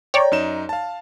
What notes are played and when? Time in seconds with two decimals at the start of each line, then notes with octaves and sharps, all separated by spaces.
0.14 C#5 D5 G5 A#5
0.32 F#2 D#4 E7
0.69 F5 A5